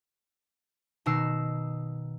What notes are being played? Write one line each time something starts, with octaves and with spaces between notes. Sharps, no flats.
B2 D#3 D#4 E6 C7